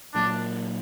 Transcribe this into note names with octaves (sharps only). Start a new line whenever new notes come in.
A#2 F#3 A#3 D4